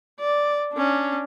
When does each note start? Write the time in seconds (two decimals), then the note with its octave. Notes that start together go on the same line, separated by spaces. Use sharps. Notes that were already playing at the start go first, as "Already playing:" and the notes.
0.20 D5
0.73 C#4 D4